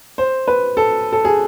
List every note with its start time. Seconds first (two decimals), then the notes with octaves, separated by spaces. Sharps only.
0.18 C5
0.48 B4
0.77 A4
1.12 A4
1.25 G#4